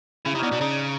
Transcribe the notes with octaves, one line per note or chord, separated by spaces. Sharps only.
C#3 E4
B2 C3 C#4 D4 D#4
B2 D4
C#3 D#4